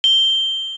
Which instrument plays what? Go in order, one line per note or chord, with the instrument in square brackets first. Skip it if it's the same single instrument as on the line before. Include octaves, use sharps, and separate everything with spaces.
[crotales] G7